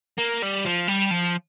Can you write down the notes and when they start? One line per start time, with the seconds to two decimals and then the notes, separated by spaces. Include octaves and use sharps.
0.18 A#3
0.42 G3
0.65 F3
0.88 G3
1.11 F3